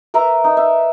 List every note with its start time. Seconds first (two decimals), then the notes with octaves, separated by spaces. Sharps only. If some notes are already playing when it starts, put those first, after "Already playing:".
0.14 A#4 B4 E5 A#5
0.44 D#4
0.57 E5